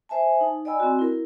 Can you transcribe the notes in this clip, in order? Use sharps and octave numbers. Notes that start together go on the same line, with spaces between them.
C5 E5 G#5 A5
D#4
D5 D#5 G5 G#5 B5 E6
C4 F#4
E4 A#4